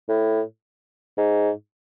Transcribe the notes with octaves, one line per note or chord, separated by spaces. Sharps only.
A2
G#2